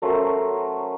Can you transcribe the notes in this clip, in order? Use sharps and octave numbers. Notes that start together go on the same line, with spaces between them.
F#3 A3 C#4 A#4 C5